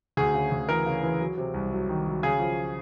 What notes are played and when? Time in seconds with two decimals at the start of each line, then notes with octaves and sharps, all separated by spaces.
0.17 D2 G#4
0.34 C#3
0.52 D2
0.69 E3 A#4
0.86 C#3
1.03 E3
1.20 F#3
1.38 C3
1.54 C2
1.72 F#3
1.89 D#3
2.06 F#3
2.23 C#3 G#4
2.40 F3